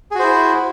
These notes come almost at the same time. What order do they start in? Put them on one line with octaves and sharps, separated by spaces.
G#4 F#4 C5 E4